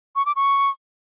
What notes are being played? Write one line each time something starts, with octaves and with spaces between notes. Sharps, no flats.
C#6
D6
C#6